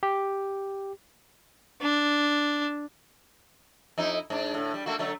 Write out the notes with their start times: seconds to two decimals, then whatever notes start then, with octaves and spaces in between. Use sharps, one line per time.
0.03 G4
1.81 D4
3.98 F2 D#4 E4
4.30 G#2 D4
4.54 A2 D3
4.74 G3
4.86 A3 A#3 F#4
4.99 D3 F#3 A3